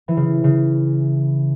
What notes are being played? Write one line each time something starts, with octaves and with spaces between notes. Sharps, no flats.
E3
C#3
C#3